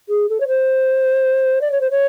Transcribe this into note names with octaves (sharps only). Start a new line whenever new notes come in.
G#4
A4
C#5
C5
D5
C#5
C5
C#5